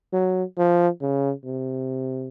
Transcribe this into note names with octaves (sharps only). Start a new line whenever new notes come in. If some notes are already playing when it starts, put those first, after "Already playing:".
F#3
F3
C#3
C3